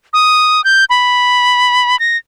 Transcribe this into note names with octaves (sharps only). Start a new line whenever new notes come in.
D#6
G6
B5
A#6